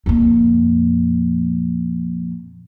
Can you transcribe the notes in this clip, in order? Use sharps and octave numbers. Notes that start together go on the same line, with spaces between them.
F2 A#2